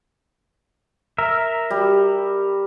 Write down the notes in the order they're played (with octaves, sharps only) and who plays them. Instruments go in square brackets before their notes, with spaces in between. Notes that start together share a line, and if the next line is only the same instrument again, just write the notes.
[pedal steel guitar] A#4 E5
[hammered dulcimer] G3